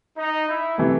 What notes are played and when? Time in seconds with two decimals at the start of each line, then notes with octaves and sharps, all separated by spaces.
0.18 D#4
0.48 E4
0.78 C3 E3 A3